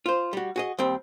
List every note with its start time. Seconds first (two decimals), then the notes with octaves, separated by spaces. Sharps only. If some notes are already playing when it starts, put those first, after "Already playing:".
0.06 F4 C5
0.33 G3 F#4
0.56 F#4 G#4 D#5
0.78 D#2 G3 C4